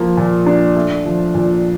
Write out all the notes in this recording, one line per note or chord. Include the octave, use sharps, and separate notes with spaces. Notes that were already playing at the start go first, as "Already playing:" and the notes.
Already playing: F3 A#3
A#2
D4
A3
F3
A#2